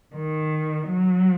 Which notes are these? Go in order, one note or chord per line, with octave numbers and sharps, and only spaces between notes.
D#3
F#3